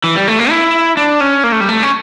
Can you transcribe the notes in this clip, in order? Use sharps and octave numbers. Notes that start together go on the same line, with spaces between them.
E3
G3
A3
A#3
E4
D4
C#4
A#3
A3
G3
A3
C#4